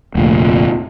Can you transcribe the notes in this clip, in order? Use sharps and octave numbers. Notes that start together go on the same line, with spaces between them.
F1 D2 A#2